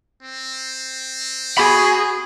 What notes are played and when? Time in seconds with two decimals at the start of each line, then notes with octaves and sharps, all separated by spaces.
0.23 C4
1.58 F#4 G#4 B5